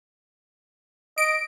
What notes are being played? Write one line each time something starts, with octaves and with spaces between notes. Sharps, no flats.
D#5 D7